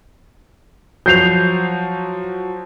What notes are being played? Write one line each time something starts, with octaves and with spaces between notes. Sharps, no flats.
F3 F#3 G6 C7 F7